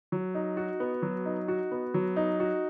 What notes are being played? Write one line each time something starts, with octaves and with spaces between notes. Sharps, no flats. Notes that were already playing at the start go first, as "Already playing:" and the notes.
F#3
D#4
F#4
B3
F#3
D#4
F#4
B3
F#3
D#4
F#4